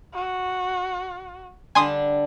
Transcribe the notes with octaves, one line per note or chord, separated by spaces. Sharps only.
F#4
D3 G3 D4 G#5 C6 D#6